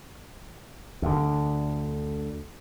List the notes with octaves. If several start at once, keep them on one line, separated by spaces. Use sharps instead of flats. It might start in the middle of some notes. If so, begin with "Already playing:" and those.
D2 D3